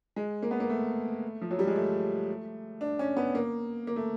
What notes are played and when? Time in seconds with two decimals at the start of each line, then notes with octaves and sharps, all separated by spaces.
0.16 G#3
0.42 A#3
0.51 B3
0.60 A#3
0.70 A3
1.41 F3
1.51 F#3
1.59 G3
1.67 G#3
1.76 A3
2.81 D4
2.99 C#4
3.17 B3
3.35 A#3
3.87 A#3
3.96 A3